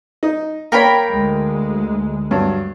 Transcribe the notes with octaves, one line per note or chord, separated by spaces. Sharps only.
D#4
A#3 A#4 C#5 G5 B5
D2 G#3
G2 F#3